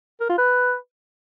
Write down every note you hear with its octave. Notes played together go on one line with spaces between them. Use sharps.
A#4
F4
B4